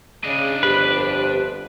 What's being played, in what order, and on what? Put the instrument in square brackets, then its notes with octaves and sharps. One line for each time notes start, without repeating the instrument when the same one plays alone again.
[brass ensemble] C#3 [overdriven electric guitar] D4 D#5
[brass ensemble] G1 F2 C5 [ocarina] G4 [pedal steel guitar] B4